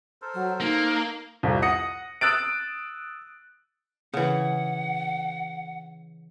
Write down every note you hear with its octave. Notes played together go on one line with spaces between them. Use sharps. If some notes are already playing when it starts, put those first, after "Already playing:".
A4 A#4 C5
F#3
A#3 D#4
C2 F2
F#5 D#6 A#6 C#7
D#6 E6 F#6 A6 D7
C#3 E3 F#5